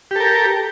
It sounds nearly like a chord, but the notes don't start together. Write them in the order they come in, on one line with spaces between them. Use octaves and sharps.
G4 A4 A#4